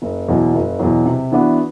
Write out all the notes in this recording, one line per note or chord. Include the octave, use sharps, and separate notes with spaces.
F#1
E2 B2 F#3
F#1
E2 B2 F#3
C3
E3 B3 D4 F#4